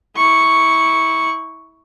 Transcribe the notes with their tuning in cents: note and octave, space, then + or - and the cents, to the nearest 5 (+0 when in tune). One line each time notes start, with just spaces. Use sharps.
E4 -20 C#6 +0